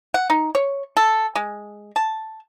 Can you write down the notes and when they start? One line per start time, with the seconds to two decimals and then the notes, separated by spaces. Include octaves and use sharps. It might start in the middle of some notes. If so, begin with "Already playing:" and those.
0.14 F#5
0.30 D#4
0.55 C#5
0.97 A4
1.35 G#3
1.96 A5